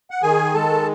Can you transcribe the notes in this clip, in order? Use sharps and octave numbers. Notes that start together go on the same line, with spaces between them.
F#5
D#3 G#4 G#5
G#3 A4 A5